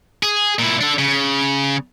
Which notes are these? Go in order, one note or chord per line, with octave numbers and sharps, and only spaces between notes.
G#4
A#2 E4
D4 A4
C#3